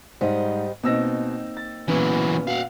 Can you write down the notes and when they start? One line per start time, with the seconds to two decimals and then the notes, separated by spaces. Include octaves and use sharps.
0.21 G#2 G3 C5 D#5
0.83 B2 A#3 C4 D#4 E6 A#6
1.57 A6
1.88 A#2 E3 F#3 B3 C#4
2.47 F#4 F5 F#5